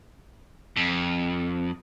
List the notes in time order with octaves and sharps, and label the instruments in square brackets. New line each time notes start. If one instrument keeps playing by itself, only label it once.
[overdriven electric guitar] F2